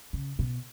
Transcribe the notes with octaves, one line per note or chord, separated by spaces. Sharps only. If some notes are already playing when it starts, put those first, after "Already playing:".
C#3
B2